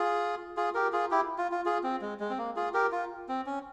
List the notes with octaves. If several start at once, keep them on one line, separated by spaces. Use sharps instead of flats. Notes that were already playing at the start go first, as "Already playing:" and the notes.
Already playing: F4 G#4
F4 G#4
G4 A#4
F4 G#4
E4 G4
F4
F4
F4 G#4
C4
G#3
G#3
C4
A#3
F4 G#4
G4 A#4
F4
C4
C#4